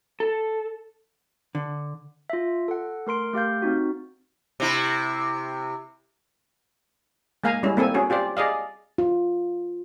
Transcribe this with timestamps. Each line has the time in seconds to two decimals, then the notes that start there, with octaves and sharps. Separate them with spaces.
0.20 A4
1.55 D3
2.30 F4 E5
2.68 A4 F#5
3.07 A3 A#4 C6 D7
3.33 A3 G4 F5 G6
3.62 C4 D#4 F#4
4.60 C3 E4
7.44 G#3 A#3 F5 G#5 A#5
7.63 G3 G#3 C#4 E4
7.77 A#3 C4 A4 G#5
7.94 C#4 F#4 G#4
8.10 F4 G4 C5 D5
8.37 G#4 D5 D#5 F5
8.98 F4